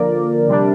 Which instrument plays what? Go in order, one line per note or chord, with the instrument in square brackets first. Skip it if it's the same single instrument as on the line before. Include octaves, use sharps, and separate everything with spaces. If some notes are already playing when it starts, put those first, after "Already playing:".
Already playing: [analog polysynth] D3 F3 A#3 A#4 D5
C3 G3 D4